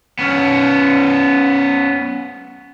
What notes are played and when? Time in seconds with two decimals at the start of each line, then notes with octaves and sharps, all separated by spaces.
0.19 B3 C#4